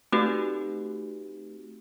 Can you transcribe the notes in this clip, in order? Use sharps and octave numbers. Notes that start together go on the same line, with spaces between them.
A3 C4 D#4 F#4 G4 B4